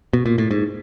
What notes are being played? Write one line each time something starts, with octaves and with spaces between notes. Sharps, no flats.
B2
A#2
A2
G#2